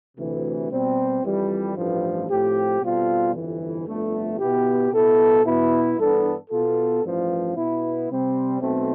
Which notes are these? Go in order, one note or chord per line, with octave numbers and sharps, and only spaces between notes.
D2 C3 E3
B2 G3 C4
F2 E3 G3
A1 G2 F3
A2 F3 C4 G4
B2 G3 C4 F4 A4
G1 F2 E3
G1 F2 D3 A3
B2 B3 E4 G4
B2 B3 E4 A4
B2 B3 E4
G2 E3 B3 D4 A4
B2 B3 F4 A4
A1 G2 F3
B2 B3 E4
C3 G3 C4
B1 B2 A3 C4